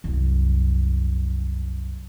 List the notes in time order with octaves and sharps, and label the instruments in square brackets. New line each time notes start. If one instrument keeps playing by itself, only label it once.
[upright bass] C2 F#2